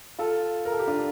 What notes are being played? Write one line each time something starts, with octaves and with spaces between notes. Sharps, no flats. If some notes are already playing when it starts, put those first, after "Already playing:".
F4 A4
A#4
A4
G4
D4 F4